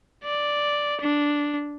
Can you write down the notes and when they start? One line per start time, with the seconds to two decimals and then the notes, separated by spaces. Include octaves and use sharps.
0.24 D5
1.01 D4